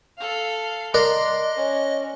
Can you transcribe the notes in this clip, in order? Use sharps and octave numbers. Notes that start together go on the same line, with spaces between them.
A4 F5
D4 A#4 D#5 C6
C#4